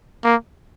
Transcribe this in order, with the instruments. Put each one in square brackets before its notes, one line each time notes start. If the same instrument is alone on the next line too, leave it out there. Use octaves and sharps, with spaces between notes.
[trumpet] A#3